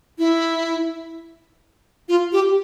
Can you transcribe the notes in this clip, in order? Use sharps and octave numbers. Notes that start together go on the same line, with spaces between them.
E4
F4
G4